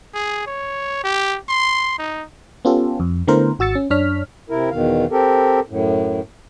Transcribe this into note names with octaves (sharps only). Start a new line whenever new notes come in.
G#4
C#5
G4
C6
D#4
B3 C#4 F4 G4 A4
F2
D3 A3 B3 E4 A#4 C5
G#1 F#4 E6 A6 C#7
C#4
F#2 D4 C#5 F6 B6
C3 E4 A#4
E2 B2 D#3 F5
C4 G4 A4 A#4
F#2 A2